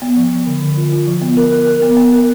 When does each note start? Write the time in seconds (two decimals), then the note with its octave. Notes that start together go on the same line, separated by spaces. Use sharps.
0.02 B3
0.16 F3
0.32 F3
0.47 D3
0.62 D3
0.77 F4
0.92 F4
1.07 F3
1.22 B3
1.37 A#4
1.52 A#4
1.67 A#4
1.82 B3
1.97 B3
2.13 A#4